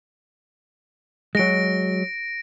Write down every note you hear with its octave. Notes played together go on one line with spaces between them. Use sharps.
F#3 G#3 A#6 D7